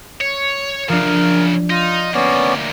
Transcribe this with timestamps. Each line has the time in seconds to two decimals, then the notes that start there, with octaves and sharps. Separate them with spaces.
0.21 C#5
0.89 F#2 C#3 F3 D4 A#4
1.70 D#4 F4
2.14 D2 A#3 B3 C#4 D5